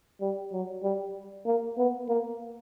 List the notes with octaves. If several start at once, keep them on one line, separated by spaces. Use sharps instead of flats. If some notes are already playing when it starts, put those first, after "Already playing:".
G3
F#3
G3
A#3
B3
A#3